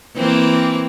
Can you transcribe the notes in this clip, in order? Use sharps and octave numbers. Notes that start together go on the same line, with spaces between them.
E3 A#3 C4